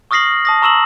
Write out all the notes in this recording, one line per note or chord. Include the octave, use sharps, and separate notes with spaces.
C#6 D#6 F6 A#6 C7 F#7
A5 D#6 A#6
A#5 C#6 E6 E7 F#7